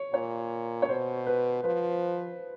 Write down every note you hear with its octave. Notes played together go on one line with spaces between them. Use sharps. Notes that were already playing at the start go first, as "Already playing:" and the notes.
Already playing: C#5
A#2 C#5
C#5
B2 C5
B4
F3 B4